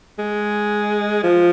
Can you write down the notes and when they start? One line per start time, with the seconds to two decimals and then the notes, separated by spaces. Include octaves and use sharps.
0.19 G#3
1.24 F3